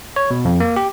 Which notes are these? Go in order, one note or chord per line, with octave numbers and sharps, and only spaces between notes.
C#5
B2
F2
A#3
G4